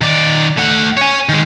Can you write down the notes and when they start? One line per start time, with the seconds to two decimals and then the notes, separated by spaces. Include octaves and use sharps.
0.01 D#3 D5
0.58 A3 F#5
0.97 C#5 G#5
1.29 D#3 G#3